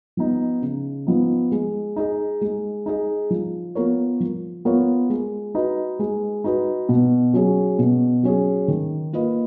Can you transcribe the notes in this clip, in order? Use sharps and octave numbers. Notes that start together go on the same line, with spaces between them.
F3 B3 D#4
C#3
F3 B3 D#4
G#3
D#4 G#4 D#5
G#3
D#4 G#4 D#5
F3
B3 F4 A#4 C#5
F3
B3 F4 A#4 C#5
G#3
D#4 F#4 B4 D#5
G#3
D#4 F#4 B4 D#5
B2
F#3 C#4 G#4
B2
F#3 C#4 G#4
D#3
A#3 F4 B4 D#5